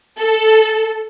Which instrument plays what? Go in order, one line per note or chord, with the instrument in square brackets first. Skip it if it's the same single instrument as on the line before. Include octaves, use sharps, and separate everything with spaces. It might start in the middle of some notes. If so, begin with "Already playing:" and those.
[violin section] A4